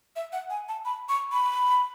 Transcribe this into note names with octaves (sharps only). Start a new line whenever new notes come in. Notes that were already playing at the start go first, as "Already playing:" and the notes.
E5
F#5
G#5
A5
B5
C#6
B5